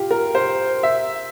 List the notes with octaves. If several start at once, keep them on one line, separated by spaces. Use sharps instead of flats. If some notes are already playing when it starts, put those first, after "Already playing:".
Already playing: F4 G4
A#4
C5
E5